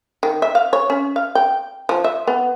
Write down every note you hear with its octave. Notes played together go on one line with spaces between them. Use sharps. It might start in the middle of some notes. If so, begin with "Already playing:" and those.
D#3
E5
F5
C#5
C#4
F5
G5
F3
E5
B3